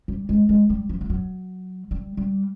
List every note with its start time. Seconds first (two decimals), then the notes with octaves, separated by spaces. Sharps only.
0.08 G3
0.29 G#3
0.49 G#3
0.69 G3
0.89 F3
1.01 F3
1.10 F#3
1.91 G3
2.17 G3